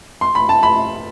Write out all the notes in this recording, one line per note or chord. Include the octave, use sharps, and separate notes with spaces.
C6
B5
A5
B5